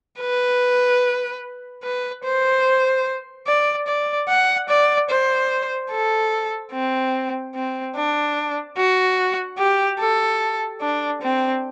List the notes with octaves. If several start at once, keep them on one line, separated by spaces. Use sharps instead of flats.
B4
B4
C5
D5
D5
F#5
D5
C5
A4
C4
C4
D4
F#4
G4
A4
D4
C4